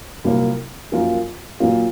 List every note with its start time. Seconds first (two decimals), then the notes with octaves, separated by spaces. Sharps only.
0.24 C2 A#2 F#3 A#3
0.92 F#2 F3 A#3 F4
1.60 A#2 F#3 A#3 F4